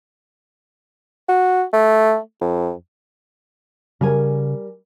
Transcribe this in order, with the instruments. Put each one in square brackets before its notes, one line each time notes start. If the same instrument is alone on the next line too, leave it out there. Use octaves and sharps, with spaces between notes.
[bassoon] F#4
A3
F2
[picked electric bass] C#3 [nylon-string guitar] G3 A#4 G#5